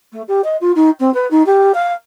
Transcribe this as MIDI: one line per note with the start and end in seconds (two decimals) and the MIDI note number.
0.12 0.22 57
0.28 0.41 67
0.44 0.56 75
0.61 0.72 65
0.75 0.90 63
1.00 1.12 60
1.14 1.29 71
1.31 1.45 63
1.46 1.72 67
1.74 1.93 77